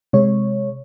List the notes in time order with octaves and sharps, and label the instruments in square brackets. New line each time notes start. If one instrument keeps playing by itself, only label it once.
[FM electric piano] C3 G#3 C#5